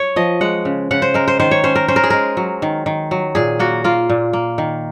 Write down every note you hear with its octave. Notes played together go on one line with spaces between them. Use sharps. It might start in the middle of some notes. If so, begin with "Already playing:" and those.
Already playing: C#5
F3 D#5
G#3 F#5
C#3
C#3 F#5
C5
G#3 A#4
C5
D#3 C5
C#5
C#4 C5
A#4
C#4 C5
A#4
G#4
G#3 A#4
F#3
D#3
D#3
F#3
A#2 G#4
A#3 F#4
A#3 F4
A#2
A#3
D#3